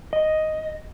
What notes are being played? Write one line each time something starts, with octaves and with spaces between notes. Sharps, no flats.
D#5